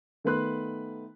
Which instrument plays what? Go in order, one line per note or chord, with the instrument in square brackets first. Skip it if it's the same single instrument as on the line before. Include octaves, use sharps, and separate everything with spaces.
[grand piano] D#3 A3 B3 B4 C6 F#6